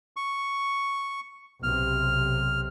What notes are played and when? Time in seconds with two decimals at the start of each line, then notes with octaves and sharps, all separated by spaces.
0.16 C#6
1.63 B1 C3 F6